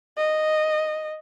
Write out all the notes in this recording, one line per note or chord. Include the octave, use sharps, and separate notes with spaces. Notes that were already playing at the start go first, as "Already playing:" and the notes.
D#5